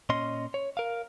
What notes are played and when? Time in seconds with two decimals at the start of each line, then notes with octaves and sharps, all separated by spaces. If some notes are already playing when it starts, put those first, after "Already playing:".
0.09 A#2 C#4 D#5 C6
0.54 C#5
0.77 A#4 F5